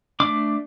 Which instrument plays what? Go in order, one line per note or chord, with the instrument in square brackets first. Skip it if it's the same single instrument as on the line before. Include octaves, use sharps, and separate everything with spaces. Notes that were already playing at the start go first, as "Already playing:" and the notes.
[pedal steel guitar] A3 D4 D6